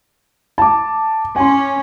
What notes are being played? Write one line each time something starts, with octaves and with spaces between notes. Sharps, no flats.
A5 D6
C#4 G#5 C6